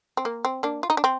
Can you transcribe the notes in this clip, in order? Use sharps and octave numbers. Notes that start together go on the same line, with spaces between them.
C4
A#3
C4
A#3 D4
F4
D#4
D4
C4